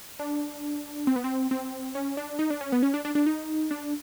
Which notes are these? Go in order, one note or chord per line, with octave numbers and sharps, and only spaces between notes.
D4
C4
B3
C4
C4
C#4
D4
D#4
D4
C#4
B3
C#4
D4
D4
D4
D#4
D4